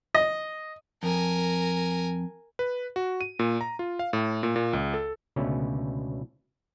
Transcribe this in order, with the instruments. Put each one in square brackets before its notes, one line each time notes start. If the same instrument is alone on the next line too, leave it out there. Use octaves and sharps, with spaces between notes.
[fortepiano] D#5
[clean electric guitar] F2 [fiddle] A#4 G#5
[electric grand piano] B4
F#4
D#7
A#2
A#5
F4
F5
A2
A#2
A#2
C#2
A4
[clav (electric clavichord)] C#2 B2 D3 A3 C#4